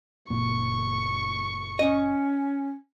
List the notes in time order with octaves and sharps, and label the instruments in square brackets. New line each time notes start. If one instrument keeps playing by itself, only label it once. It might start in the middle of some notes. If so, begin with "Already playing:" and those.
[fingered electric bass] F#1 A#2 A#3 [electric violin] C#6
[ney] C#4 [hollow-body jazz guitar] D#5